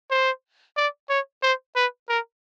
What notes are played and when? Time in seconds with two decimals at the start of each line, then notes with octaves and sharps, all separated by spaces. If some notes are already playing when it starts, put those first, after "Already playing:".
0.11 C5
0.77 D5
1.09 C#5
1.42 C5
1.76 B4
2.09 A#4